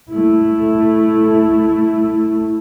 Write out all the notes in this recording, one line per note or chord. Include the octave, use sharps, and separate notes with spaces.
A3 E4